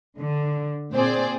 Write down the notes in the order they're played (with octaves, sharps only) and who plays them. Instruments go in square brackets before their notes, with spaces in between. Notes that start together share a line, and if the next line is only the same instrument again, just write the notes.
[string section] D3
A#2 C4 G#4 C5 D5